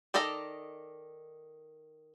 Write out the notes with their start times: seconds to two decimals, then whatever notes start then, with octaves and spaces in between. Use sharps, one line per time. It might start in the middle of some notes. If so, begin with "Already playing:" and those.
0.14 D#3 A4 D5 D#5 A#5